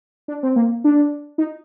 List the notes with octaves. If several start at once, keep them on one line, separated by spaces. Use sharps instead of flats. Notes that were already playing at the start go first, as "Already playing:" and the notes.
D4
C4
A#3
D4
D#4